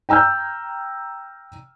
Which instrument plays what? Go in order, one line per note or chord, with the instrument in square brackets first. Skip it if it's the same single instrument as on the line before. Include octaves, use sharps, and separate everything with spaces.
[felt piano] G5 A#5 E6 F6 G6